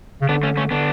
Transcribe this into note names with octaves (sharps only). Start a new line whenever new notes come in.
C#3
D3 B3 D4
A3 C#4
A3 C#4
D3 B3 D4